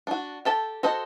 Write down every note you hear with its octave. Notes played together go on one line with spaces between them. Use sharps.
D4 F#4
G4 A4 A5
F#4 A4 C5 D#5